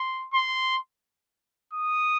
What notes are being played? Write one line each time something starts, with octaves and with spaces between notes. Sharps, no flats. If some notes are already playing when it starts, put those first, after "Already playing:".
Already playing: C6
C6
D#6